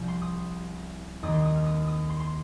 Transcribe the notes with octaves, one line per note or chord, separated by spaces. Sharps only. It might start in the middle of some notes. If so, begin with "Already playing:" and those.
Already playing: C2 C3 F3
C6
D#6
D#2 D#3 D#6
C6
D#6
F6
D#6
D#6
C6
C6